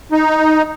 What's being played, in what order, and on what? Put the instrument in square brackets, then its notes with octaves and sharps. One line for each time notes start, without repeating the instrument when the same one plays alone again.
[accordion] D#4